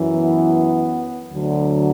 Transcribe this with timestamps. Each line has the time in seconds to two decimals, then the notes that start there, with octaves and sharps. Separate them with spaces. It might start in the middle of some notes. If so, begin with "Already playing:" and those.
Already playing: F#2 E3
0.12 B3
1.32 D2 D3 F#3